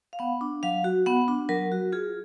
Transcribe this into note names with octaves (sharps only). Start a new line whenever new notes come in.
F5
B3 F#5
D4
F#3 F5
F#4
B3 F#5
D4
F#3 A#4
F#4
F4 G#4